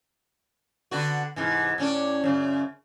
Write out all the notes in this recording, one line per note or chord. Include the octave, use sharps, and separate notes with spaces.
D3 B3 F#4
G#2 C3 E3
A2 C#4 D4
F#2 C#3